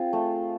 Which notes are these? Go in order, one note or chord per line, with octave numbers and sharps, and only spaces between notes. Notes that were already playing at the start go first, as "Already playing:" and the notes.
Already playing: C4 F4 G#4
A3